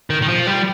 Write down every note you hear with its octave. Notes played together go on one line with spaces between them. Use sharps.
D#3
D#3
F3
G3